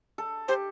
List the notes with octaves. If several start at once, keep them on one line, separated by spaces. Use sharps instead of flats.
A4
G4 C5